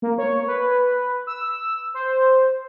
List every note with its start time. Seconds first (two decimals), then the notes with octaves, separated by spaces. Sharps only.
0.02 A#3
0.18 C#5
0.48 B4
1.27 E6
1.94 C5